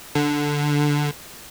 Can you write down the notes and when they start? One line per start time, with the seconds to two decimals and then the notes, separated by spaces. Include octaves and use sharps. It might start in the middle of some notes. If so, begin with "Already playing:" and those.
0.15 D3